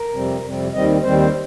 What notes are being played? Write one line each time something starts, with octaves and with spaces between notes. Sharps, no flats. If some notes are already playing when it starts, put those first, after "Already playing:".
Already playing: A#4
F2 C3 G3 C4
F2 C3 G3 C4
D#2 D#3 G3 C4 D#5
D#2 D#3 G3 C4 C5
C5